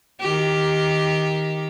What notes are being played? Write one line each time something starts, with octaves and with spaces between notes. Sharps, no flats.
D#3 G4